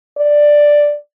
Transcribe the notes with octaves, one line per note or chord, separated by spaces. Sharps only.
D5